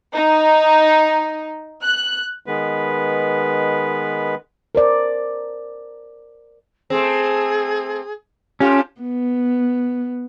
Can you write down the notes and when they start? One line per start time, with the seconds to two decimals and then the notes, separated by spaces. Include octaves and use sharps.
0.14 D#4
1.83 F#6
2.46 D#3 G#3 B3 B4
4.75 A#4 C5 D5
6.90 A3 C4 G#4
8.60 A3 C#4 F4 G4
9.01 B3